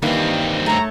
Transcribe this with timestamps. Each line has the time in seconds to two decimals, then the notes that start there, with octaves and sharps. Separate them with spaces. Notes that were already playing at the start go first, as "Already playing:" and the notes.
0.02 G2 D#3 E3 G3 A#3 C4
0.66 A3 C#5 A#5